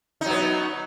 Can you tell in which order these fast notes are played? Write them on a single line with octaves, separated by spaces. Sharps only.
D#4 F#3 B3